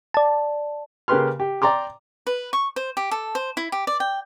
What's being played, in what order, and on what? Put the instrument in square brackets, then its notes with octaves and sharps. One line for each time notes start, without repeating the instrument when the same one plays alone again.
[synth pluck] D5 A5
[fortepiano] C#3 A#3 G4 B4 C6 F6
G4
D5 G5 A#5 C6 D6
[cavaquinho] B4
C#6
C5
G4
A4
C5
E4
G4
D5
G5